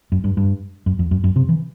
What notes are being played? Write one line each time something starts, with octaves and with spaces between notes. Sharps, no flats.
F#2
G2
G2
F#2
F2
F#2
F#2
C3
E3